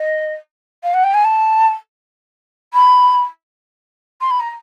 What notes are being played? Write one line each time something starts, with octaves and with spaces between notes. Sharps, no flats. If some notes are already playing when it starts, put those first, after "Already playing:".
Already playing: D#5
F5
F#5
G5
G#5
A5
B5
C6
B5
A#5